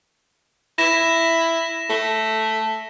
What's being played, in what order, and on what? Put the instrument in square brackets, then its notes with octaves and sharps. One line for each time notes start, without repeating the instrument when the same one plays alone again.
[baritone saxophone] E4 [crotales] A#6 E7
[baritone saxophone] A3